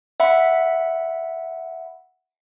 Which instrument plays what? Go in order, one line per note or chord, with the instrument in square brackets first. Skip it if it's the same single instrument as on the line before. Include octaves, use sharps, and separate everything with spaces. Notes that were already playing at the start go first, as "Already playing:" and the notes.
[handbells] E5 F#5 B5